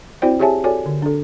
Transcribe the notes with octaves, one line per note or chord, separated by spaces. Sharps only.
C4 E4 F#4 C5 D5 G5
G4 G#4 C#5 E5 G#5 A5
F#4 A4 C#5 D5 G#5
D3
D4 A4